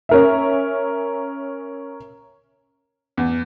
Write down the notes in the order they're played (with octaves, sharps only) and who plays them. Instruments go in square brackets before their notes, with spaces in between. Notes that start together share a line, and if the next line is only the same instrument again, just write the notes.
[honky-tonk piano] C#4 A#4 E5
[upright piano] E2